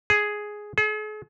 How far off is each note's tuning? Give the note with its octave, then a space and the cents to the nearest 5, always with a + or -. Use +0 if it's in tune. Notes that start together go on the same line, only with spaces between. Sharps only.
G#4 +5
G#4 +45